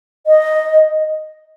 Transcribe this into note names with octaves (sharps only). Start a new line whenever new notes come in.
D#5